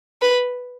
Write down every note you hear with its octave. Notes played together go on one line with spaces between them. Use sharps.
B4